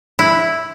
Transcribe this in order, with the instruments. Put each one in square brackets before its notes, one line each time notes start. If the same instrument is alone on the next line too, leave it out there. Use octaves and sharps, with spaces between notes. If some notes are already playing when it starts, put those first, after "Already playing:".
[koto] E4